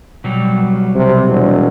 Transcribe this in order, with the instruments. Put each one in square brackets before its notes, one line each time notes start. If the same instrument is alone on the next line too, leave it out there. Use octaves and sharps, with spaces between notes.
[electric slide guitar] B2 F#3 G3
[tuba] C3
E1